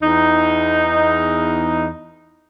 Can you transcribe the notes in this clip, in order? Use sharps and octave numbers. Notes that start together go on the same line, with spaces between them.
E2 D#4